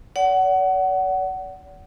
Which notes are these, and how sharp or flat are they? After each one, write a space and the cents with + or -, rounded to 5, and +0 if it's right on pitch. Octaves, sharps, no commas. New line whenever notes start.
D5 -45 F#5 +20